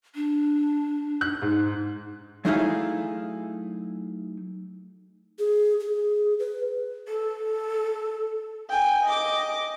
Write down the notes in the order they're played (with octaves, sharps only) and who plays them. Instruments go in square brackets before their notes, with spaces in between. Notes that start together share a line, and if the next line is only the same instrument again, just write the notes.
[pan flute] D4
[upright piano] F#6
G#2
[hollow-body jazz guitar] F#3 A3 D#4 E4 G#4 F5
[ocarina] G#4
G#4
B4
[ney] A4
[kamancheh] G5 G#5
D#5 D6